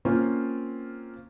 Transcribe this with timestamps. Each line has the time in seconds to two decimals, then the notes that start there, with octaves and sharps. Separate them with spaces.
0.05 A#3 C4 C#4 F4